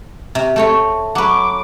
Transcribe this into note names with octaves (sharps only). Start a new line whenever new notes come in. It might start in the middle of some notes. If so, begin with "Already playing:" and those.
C3
A3 C4 C#5
F#3 B4 D6